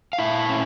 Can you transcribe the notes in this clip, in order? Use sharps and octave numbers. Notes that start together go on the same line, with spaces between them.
F5
A#2 E4 E5
C#4